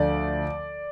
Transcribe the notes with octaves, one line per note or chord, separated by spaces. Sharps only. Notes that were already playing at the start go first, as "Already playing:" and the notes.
Already playing: D2 D3 F3 D5